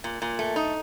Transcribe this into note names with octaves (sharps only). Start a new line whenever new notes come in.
A#2
A#2
A3
D#4